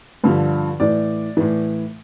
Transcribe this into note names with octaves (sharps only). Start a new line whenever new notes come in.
G2 D3 F3
A2 E3 D5
A2 E3